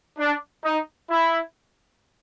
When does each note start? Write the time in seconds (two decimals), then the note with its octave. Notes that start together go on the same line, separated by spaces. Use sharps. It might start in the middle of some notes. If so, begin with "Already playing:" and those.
0.18 D4
0.64 D#4
1.11 E4